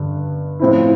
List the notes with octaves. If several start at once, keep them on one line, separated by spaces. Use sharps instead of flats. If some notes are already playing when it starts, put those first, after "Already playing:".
Already playing: G2 D3
A2 F3 C4 E4